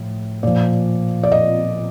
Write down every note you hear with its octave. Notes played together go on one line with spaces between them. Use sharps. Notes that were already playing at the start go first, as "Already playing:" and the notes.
Already playing: A2 F3
A#2 F3 D5
D5
D#5